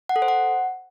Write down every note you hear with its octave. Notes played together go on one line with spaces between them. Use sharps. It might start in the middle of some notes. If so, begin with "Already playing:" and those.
F#5
A4
C5
F#5